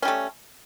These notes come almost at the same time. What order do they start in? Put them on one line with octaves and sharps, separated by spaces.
C#4 G3 A3